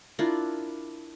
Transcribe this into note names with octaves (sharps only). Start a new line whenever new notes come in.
D4 E4 F4 A#4